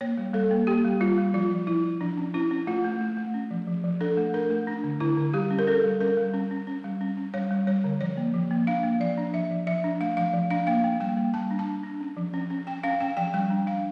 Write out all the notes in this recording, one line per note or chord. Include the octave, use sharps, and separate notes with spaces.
A#3 C#5
G3
G3 A4
A#3
A#3 G4
G3
G3 F4
G3
F3 F4
F3
F3 E4
F3
F3 D4
C#4
C#4 E4
C#4
A3 F4
A3
A3
A3
C#4
F3
F3
F3
D4 A4
A3
D4 A#4
A3
D4
D3
D3 E4
D3
G3 G4
C#4
A#4
C#4 A4
G3
C#4 A#4
G3
C#4
C#4
C#4
G3
C#4
C#4
G3 C#5
G3
G3 C#5
D3
F3 C#5
A#3
F3
A#3
D4 F5
A#3
F3 D5
D4
F3 E5
F3
F3 E5
D4
A3 F5
F3 F5
F3
D4 F5
A#3 F5
A#3
G3 G5
A#3
G3 A5
D4
A5
D4
D4
C#4
F3
C#4
C#4
C#4 G5
C#4 F5
C#4 G5
F3 G5
G3 G5
D4
D4 F5